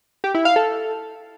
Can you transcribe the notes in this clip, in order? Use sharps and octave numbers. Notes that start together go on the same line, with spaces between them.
G4
E4
F5
A4